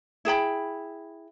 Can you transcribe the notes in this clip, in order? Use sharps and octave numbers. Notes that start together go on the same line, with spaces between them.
E4 G#4 G5 B5